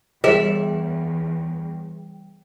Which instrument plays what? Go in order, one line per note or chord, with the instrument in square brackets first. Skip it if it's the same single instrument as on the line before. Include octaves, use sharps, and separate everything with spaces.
[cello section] E2 [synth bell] G3 G5 [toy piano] G#4 C#5 [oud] E5